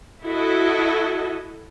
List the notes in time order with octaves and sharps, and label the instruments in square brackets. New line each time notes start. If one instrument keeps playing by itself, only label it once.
[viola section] E4 F#4 A4 D#5